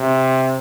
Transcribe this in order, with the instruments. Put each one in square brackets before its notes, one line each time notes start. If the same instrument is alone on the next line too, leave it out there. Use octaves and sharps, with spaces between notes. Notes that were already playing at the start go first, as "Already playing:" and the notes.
Already playing: [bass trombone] C3